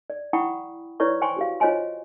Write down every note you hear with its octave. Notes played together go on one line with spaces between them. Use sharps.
D5
E4 F#5 G5 B5 C#6 D#6
E4 B4 C#5 D5 C#6
C5 G5 G#5 C6 C#6
F#4 G4 F5
F4 C5 C#5 D#5 G#5 C6